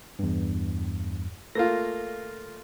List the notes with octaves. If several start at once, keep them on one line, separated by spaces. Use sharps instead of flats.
E2 G2
A3 A#3 F4 A#6